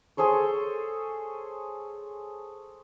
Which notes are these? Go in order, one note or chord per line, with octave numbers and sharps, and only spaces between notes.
G#4 A4 C5 C#5